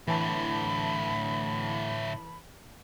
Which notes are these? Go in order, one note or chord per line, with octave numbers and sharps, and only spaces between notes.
A2 D3 E3 A5 B5